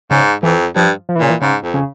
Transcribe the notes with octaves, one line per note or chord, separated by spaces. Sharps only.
G#2 C#3
F2 E3
G2 F3
F3
E3
A#2 C#3
E3
G#2 C#3
F2
C#3